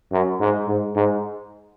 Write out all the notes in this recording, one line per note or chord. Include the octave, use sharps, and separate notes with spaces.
F#2
G#2
G#2
G#2